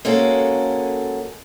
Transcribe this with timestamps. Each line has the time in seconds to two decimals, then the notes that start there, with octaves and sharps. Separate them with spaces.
0.05 G#3 A#3 C#4 F#4 A4